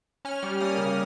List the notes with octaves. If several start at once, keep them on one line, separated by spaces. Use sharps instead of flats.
C#4 F6
G3
A#3 D#6
C#3